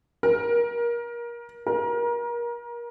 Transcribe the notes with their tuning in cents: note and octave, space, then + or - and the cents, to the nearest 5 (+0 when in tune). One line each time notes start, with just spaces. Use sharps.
A#4 +25
A#4 +30